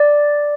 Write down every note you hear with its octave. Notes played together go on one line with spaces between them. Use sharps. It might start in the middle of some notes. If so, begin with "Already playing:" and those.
Already playing: D5